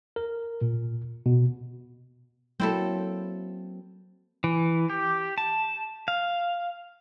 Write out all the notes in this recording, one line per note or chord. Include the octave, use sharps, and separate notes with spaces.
A#4
A#2
B2
F#3 A#3 C4 E4 A4
E3
G4
A5
F5